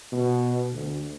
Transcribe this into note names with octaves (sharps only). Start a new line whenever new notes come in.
B2
D2